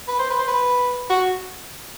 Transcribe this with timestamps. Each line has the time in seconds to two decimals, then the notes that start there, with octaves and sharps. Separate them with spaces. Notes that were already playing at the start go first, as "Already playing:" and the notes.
0.08 B4
0.19 C5
0.30 B4
0.39 C5
0.48 B4
1.10 F#4